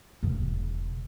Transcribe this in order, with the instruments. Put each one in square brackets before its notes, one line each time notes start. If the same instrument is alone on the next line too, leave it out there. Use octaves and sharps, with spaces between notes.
[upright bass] E1 C#3